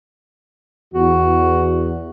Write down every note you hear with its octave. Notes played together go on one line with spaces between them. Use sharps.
E2 F#4